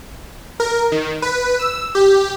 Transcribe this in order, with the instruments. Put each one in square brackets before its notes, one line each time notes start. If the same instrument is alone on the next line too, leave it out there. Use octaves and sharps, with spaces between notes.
[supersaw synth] A#4
D#3
B4
E6
G4